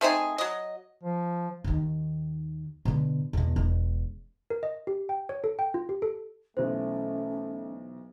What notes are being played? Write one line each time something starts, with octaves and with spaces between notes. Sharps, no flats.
A3 C4 D#4 G#4
F#3 D#5
F3
D#2 D#3
B2 D3
E2 B2
E1
A#4
D#5
G4
G5
C#5
A4
G5
F4
G4
A4
B1 E3 A3 C#4 C5